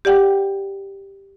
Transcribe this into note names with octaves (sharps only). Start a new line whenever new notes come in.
G4 D5 F#5 G5